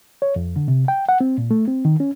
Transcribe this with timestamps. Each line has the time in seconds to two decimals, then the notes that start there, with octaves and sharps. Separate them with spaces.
0.22 C#5
0.36 F2
0.56 D3
0.68 C3
0.88 G5
1.09 F#5
1.21 C4
1.38 A#2
1.51 A3
1.68 C4
1.85 D#3
2.00 C#4